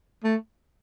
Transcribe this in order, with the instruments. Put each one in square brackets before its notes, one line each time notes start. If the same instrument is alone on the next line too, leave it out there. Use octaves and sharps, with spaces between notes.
[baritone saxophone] A3